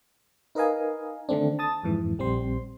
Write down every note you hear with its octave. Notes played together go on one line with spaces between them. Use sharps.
D#4 A#4 B4 D#5 F5 G#5
D3 D#3 A3 C4 D4
A5 D#6 A6
F2 G#2 E3
A#1 G3 C4 C5 C6